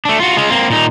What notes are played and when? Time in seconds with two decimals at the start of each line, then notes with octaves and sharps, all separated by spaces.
0.05 A3 D4
0.20 F4 F#4
0.37 G#3 F4
0.50 A#3 C4
0.70 A#2 D#4